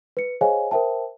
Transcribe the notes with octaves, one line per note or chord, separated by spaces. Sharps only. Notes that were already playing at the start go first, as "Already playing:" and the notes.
B4 C#7
G#4 C5 C#5 D#5 F5 G#5
A#4 C5 E5 G5 A5